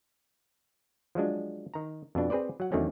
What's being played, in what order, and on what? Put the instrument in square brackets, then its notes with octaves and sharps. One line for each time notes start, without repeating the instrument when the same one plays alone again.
[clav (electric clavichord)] F3 F#3 G#3 D4
D#3 A#5
F2 B2 D4
C4 G#4 B4 C5 D5
F#3 F#5
E2 D#3 F#3 A3 C4 C#4